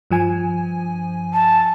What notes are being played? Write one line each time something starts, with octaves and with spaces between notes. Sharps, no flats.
G2 F3 G#5
A5